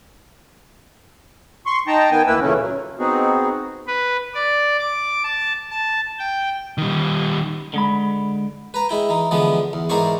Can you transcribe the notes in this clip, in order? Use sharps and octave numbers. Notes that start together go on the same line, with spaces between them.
C6 C#6
D#4 G5 A5 A#5
D#3 B3 G5 G#5
D2 A#3 E4 B4 E6
A#2 C#3 E3 A3 C#4
F#3
B3 C4 D#4 F#4 G#4
B4
D5
D6
A5
A5
G5
D#3 G3
D3 G#3 B5
B4 A#5
G#3 E4 G5
E3 D#4
D3 E3 F3 G#3 B3
E2
G#2 E3 A#4 C5 D5 C#6